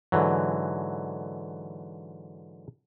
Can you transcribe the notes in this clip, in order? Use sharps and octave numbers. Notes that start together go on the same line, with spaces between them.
G#2 D3 E3 F#3